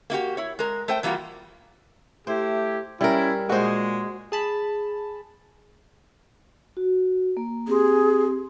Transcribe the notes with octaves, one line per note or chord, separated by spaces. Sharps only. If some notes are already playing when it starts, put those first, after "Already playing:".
A#3 E4 F#4 G4
E4 C#5
G#3 A#4
A3 C5 G5
E3 G3 A#3 F4 F#4
A3 E4 G4 C5
G3 C#4 E4 A#4
A#2 G#3 F#4 C5
G#4 A5 B5
F#4
A#3
C4 G4 G#4 C6